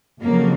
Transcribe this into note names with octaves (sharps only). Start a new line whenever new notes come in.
F2 C#3 F#3 A#3